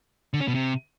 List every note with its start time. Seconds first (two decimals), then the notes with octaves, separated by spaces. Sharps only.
0.34 D3
0.41 C#4
0.48 B2
0.55 C3